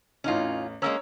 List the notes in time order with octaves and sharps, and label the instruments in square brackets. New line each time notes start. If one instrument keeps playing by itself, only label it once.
[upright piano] A1 E2 [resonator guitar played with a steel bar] C#4 D#4 F4
[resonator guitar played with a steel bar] G#3 A#3 C#4 [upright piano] C#5 A#5 E6